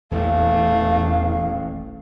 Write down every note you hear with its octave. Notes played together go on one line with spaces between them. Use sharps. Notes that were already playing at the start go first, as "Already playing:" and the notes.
D#1 A1 E2 G2 A3 F5